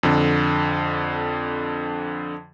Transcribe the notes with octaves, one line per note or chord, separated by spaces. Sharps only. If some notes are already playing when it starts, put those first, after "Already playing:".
F2 D3